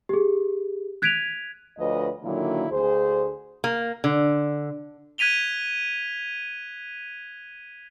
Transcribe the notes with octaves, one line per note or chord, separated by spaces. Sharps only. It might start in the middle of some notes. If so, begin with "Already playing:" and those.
G4 G#4
F#6 G#6 B6 D7 D#7 F7
D2 F3 B4 C#5 D#5
A#2 D3 D#3 F#3 A#3 E4
D2 G#4 C5
A#3
D3
F#6 G#6 B6 D#7 F7 G7